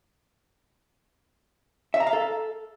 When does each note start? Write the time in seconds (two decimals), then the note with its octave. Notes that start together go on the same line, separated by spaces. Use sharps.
1.94 E5
2.00 A#5
2.07 F5
2.13 A4